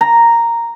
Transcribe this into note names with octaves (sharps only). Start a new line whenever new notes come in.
A#5